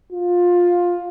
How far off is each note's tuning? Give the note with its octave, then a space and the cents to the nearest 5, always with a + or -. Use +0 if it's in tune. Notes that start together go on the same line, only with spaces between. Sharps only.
F4 +15